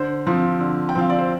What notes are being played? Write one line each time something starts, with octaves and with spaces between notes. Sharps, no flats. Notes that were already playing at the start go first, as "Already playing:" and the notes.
Already playing: D3 C5
F3 C4
D3
G5
F3 C4 F5
D5
C5